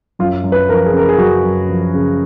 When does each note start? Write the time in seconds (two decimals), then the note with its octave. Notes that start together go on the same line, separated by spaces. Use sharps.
0.19 F#2 F4
0.44 F#2
0.52 B4
0.69 F3 A#4
0.86 G#4
0.93 C#3 A#4
1.09 G#4
1.18 F#2 F#4
1.45 F#2
1.69 F3
1.94 C#3